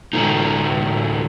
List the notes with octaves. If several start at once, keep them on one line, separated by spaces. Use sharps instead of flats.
A2 D3 F#3 A3 A#3 D#4